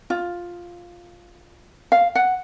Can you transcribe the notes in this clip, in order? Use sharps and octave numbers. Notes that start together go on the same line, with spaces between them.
F4
F5
F#5